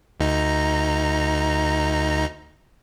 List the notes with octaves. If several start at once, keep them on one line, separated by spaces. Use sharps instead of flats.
D2 D#4 A#5